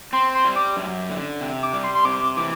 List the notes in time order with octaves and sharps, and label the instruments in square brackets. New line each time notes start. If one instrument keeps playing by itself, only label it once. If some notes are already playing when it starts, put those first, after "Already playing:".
[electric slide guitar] C4 [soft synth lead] C6
[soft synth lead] C6
[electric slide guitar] G3
[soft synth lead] D6
[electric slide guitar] F#2
D3
C3
[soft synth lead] D6
[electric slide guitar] G3
[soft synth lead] C6
C6
[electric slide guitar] C3 [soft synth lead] D6
[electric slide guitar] E3 [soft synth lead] D6